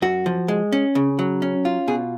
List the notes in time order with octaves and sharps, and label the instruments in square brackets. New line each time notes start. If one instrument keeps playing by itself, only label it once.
[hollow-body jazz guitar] F#2 F#4
F3
G#3
C#4
C#3
F#3
C#4
F4
B2 G#4